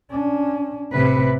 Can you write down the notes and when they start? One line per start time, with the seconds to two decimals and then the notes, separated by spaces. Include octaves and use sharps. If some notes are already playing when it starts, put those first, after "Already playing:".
0.11 C#4 D4
0.93 A1 A2 C3 B4